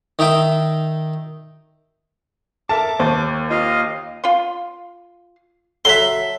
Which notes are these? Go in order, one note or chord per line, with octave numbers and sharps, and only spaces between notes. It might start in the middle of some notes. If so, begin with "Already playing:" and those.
D#3 D#4 E5 G5
A4 A#4 E5 A5 D6
D#2 C5
F4 D#5 F5
F4 C6
F#3 A4 E5 C6